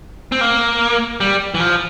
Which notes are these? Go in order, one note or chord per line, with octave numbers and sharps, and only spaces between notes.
C4
A#3
G3
E3
F3